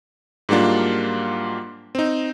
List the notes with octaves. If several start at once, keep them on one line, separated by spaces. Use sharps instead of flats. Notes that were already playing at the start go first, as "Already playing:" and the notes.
G#2 F#3 G3 A#3 D4 F4
C4 D#4